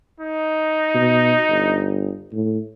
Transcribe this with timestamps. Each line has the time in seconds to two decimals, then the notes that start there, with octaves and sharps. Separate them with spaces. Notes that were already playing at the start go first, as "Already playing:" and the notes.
0.20 D#4
0.95 B2
1.49 G1
2.33 A2